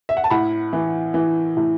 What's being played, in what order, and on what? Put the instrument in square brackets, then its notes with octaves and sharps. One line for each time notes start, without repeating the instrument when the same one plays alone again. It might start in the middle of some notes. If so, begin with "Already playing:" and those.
[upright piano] E5
F#5
A5
A2 F#5 B5
E3
E3
A2